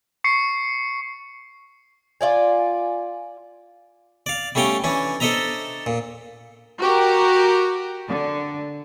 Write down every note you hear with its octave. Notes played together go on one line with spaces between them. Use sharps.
C#6 C7 C#7
F4 D5 G#5
D5 F5
G3 A3 C#4 F5 G5
E3 C#4 D4
D4 A4 C5 D#5 E5 A#5
A#2
F#4 G4 A#4
D3